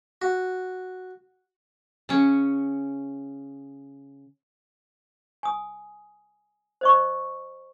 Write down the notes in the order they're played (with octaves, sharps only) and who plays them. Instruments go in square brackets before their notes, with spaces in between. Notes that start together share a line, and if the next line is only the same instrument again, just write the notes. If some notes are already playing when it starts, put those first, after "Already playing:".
[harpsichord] F#4
[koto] C#3 C#4
[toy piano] G#5 D#6
C5 D#5 C#6